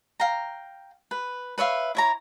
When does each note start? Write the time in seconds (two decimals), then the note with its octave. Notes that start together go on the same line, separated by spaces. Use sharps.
0.20 F5 G5 A#5
1.11 B4
1.58 B4 C#5 E5 F5
1.95 E4 C#5 A#5